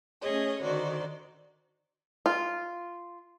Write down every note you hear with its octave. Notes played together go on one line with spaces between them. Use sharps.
A3 C#4 G#4 C#5 D#5
D3 D#3 F#4 C5 D5
F4